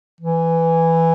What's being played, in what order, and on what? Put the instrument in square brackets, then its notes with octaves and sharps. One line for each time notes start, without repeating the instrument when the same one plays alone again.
[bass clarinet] E3